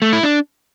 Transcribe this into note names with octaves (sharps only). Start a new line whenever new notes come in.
A3
E4
D4